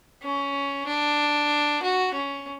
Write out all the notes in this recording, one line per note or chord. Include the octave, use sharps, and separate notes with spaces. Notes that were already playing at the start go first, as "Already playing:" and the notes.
C#4
D4
F#4
C#4